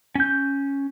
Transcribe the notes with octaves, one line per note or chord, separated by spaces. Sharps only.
C#4 G6